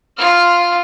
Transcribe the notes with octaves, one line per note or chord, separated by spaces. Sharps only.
F4 F6